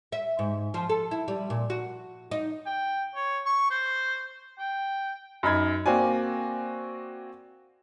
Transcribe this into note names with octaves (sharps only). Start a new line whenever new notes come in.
E5
G#2
F3
A4
E4
G3
A#2
F#4
D#4
G5
C#5
C#6
C5
G5
F#2 D#4 B5 G#6
A#3 C4 F#4 D5 G#5